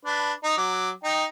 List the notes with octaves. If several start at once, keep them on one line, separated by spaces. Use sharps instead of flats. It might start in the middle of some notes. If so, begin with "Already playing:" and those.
D4 B4
D#4
F#3 D6
D#4 G5